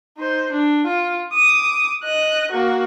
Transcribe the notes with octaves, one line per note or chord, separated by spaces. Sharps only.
D#4 C5
D4
F4
D6 D#6
D#5 F#6
A#3 F#4